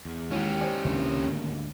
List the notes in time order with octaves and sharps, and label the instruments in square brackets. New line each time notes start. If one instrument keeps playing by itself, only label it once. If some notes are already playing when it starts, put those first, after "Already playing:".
[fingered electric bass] E2
[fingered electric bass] D#2 D#3 [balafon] G#3 E4 F#4 [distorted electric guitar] C#4 G4
[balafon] C5 D5 G#5
[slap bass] C#2 C3 E3 [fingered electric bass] D#3 A#3 D4
[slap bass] D2 G#2 D3